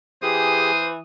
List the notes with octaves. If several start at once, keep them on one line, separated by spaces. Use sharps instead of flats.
E3 G4 G#4 C5 D#6